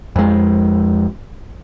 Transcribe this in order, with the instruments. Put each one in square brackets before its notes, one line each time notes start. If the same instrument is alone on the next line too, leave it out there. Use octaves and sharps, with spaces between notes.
[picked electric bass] F2 G#3